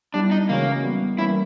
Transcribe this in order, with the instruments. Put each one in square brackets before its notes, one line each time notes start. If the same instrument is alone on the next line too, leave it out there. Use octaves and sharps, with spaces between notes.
[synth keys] G3 B3 E4 [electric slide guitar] D4
[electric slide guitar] D#4
[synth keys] C#3 E3 G#3 C#4 F#4 [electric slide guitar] A#3
[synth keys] E3 G3 B3
[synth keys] E3 G3 A#3 C#4 [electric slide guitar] E4